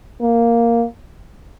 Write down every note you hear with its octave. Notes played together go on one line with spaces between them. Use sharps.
A#3